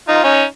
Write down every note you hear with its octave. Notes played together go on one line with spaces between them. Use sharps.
D#4 F4
C#4 D#4